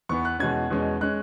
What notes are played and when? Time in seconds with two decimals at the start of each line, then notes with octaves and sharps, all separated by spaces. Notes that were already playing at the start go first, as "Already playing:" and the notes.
0.09 E2 E3 B3 C#6
0.25 F#6
0.39 E2 B2 G#3 C#4 G#6
0.70 E2 B2 G#3 C#4
1.01 G#3 C#4 F#6